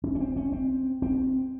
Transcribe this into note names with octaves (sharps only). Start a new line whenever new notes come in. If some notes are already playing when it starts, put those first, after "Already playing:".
C#4
C#4
C4
C#4
C4
C4